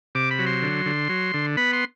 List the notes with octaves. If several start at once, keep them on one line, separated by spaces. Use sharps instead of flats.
C3 D6
B5
F#3
C6
D3
D3
F#3
D3
B3 B5
C6